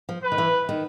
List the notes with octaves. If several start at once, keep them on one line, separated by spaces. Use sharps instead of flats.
F3
B4
D#3
E3
D#3